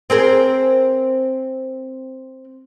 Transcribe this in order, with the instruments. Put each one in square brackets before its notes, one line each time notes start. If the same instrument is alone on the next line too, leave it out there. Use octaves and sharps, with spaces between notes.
[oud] C4 G#4 A#4